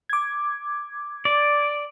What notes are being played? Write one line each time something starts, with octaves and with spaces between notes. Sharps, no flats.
D6 G#6
D5